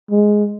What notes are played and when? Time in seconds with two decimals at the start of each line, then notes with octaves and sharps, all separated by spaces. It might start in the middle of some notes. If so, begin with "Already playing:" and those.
0.11 G#3